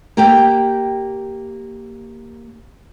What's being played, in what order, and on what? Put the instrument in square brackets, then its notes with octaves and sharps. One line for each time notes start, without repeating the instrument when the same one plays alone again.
[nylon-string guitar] A#3 G4 G5